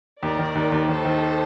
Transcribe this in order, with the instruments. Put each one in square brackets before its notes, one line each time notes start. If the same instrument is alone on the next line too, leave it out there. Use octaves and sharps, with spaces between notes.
[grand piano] D#2 [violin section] A#4 D5
[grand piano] D#3
D#2
D#2
[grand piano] D#3 [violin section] A4 C5
[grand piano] D#3